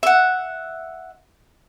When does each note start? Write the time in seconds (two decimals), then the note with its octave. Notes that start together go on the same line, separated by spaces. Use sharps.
0.03 E5 F#5